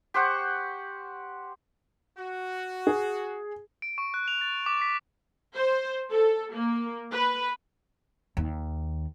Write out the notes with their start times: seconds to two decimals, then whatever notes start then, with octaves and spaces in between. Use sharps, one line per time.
0.14 G4 C5 F#5 C#6
2.18 F#4
2.87 G#4
3.82 D7
3.98 C#6
4.14 F#6
4.28 F7
4.41 A6
4.66 D6
4.81 B6
5.55 C5
6.10 A4
6.54 A#3
7.11 B4
8.37 D#2